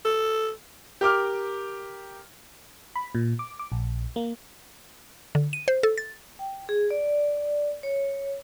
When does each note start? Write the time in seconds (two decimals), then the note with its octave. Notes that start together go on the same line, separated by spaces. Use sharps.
0.05 A4
1.01 G4 A#4 D6 F6
2.96 B5
3.15 A#2
3.39 D6
3.59 D6
3.72 A#1
4.16 A#3
5.35 D3
5.53 D#7
5.68 C5
5.83 A4
5.98 A6
6.39 G5
6.69 G#4
6.91 D5
7.83 C#5